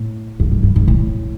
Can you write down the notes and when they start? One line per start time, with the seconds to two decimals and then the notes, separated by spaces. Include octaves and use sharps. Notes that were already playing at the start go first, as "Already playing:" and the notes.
Already playing: A2
0.40 F2
0.52 F#2
0.63 G2
0.76 G#2
0.88 A2